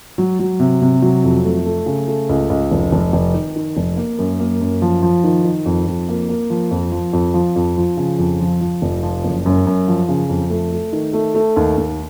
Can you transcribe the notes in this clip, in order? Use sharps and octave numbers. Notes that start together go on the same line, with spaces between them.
F#3
F#3
C3
C3
F#3
F2
A3
A3
C#3
A3
C#2
C#2
F1
F1
F1
D#3
D#3
F1
A#3
F#2
A#3
F#2
F3
F3
D#3
D#3
F2
F2
A#3
A#3
F3
F2
F3
F2
F3
F2
F3
C#3
F2
F3
F3
F1
F3
F#1
F#2
F#2
F3
C#3
F2
A3
A3
D#3
A3
A3
D#2
D#2